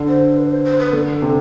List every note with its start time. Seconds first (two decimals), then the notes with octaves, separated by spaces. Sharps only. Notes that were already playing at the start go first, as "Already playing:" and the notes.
Already playing: D3
0.08 C5
0.37 B4
0.51 C5
0.65 C5
0.79 B4
0.93 D3 A4
1.22 C3